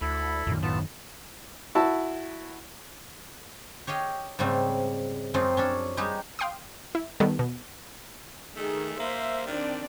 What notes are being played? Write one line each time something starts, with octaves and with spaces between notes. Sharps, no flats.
D2 E4 A4 B5
F#2 A#2 D#3
A2 B3 F4 A5
E4 F#4 E5 A5
G4 C#5 D#5 F5 G5
G#2 C#3 G3 A3 C4
F#2 F3 G#3 C4 D#4 F4
C#4 D4 A4
G3 G#3 D#4 G4
F5 G5 C6 D6 D#6
E4
D#3 G3 B3 A4
B2
D#3 A3 G#4
A#3 C5 E5
D#3 C4 D4 D5